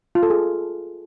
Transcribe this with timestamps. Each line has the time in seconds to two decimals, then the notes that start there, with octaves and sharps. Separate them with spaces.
0.15 F4
0.23 A4
0.30 G#4